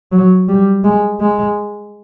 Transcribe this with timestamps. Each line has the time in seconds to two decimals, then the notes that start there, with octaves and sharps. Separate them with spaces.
0.12 F#3
0.49 G3
0.84 G#3
1.21 G#3